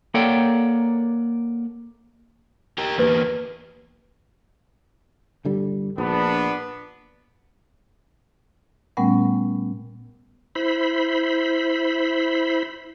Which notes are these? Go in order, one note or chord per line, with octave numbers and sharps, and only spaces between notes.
A#3 A4 C#5 D5 F#5 G5
G4 A#4
E2 A#3 G4 B4
G1 D3 G3
A#1 B3 D4
A#2 G3 A3 B3 C#4 F#5
E4 C5 B5